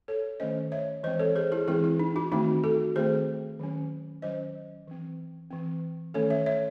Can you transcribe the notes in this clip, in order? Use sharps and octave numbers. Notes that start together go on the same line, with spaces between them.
A4 C#5
D#3 A3 C#4 C5 D#5
C#5 E5
E3 G#3 C4 C5 D#5
A4 C#5
G#4 C5
E4 G#4
E3 G#3 C4 E4 G#4
E4
D#4
D#4 F#4
D#3 A3 C4 D#4 F#4
F#4 A4
D#3 A3 C4 G#4 C5
D#3 F#3 C#4
D#3 F#3 C#4 C5 D#5
E3 C4
E3 C4
D#3 A3 C#4 A4 C#5
C#5 E5
C#5 E5